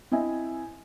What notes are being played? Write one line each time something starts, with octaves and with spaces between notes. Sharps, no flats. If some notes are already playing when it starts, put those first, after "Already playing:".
C4 E4 D#5 E5 G#5